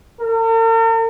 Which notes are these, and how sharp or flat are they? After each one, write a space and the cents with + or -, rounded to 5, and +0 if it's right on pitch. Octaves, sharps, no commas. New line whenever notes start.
A#4 -45